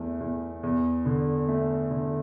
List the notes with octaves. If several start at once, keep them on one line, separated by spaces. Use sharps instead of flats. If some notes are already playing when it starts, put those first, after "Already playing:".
Already playing: E2 A3
E2
E2
D3
A3
D3